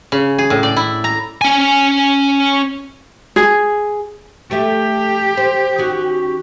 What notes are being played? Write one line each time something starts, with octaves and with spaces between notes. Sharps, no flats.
C#3
G#4
A2
D5
E4
A#5
C#4 G#5
G#4
A3 G4 A4 E5
C5
D#3 C#4 F#4